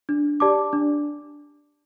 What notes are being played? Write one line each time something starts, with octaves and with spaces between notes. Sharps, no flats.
D4
G4 D5 A5 D6
D4